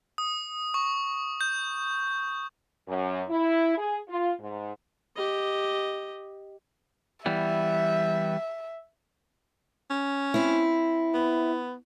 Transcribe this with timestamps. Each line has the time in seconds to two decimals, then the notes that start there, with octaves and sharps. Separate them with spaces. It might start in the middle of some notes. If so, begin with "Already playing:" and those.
0.18 D#6
0.74 C#6
1.41 G6
2.89 F#2
3.30 E4
3.78 G#4
4.09 F4
4.41 G#2
5.16 G4 D#5
7.26 E3 G3 B3 E5
9.91 C#4
10.34 C4 E4
11.14 B3